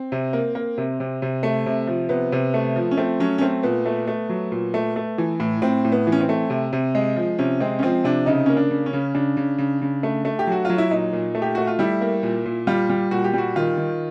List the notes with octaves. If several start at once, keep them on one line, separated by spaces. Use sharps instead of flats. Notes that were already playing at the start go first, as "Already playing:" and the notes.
Already playing: C4
C3
A#3
A#3
C3
C3
C3
A3
C3
F3
C3 B3
C3
A3
F3
C#4
A3 C4
F#3 C#4
C#4
A3 C4
A#2 B3
A3
A3
F#3
A#2
A3
A3
E3
A2
A2 C4
A2
B3
E3
C#4
C4
A3
C3
C3
G#3
F3
C3 C#4
G#3 C4
C#4
F3 C4
C3 D4
C#3 D#4
A#3 C#4
D4
C#3
C#4
C#3
C#3 D4
C#3
C#3
C#3
A3
A3
G4
F#3 F#4
F#3 F4
E4
A#2 D#4
A#2
A3
G4
A3 F#4
F4
G3 E4
A#3
A#2
A#2
G3 F4
G3
A#2 F#4
G4
G3 F#4
D#3 F4
D#3